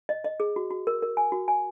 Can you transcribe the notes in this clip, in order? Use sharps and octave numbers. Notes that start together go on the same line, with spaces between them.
D#5
D#5
G#4
F#4
F#4
A#4
A#4
G#5
F#4
G#5